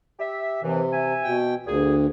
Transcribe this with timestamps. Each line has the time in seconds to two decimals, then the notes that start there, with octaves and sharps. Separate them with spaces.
0.19 G4 E5
0.63 D#2 C3 E3
0.92 E5 G#5
1.23 B2 G5
1.66 D2 A#2 G#4